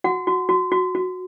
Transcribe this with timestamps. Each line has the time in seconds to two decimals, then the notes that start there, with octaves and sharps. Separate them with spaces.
0.04 F#4 F#5
0.27 F#4
0.49 F#4
0.72 F#4
0.95 F#4